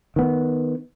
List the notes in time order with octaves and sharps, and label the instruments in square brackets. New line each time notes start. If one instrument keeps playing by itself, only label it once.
[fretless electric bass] D#3 B3